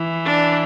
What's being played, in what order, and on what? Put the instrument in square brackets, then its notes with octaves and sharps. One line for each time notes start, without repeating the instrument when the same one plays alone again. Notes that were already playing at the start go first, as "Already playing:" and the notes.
Already playing: [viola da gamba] E3
[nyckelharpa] D4